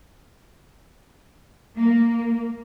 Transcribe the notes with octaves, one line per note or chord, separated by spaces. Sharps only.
A#3